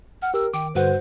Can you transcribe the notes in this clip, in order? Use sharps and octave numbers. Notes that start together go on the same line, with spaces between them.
F#5 F6
G4 A#4 E6
D#3 G5 D6
G2 D3 F#4 B4 C5 F#5